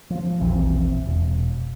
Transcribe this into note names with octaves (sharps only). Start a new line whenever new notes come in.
F3
E1 A#1 E3 C4
E1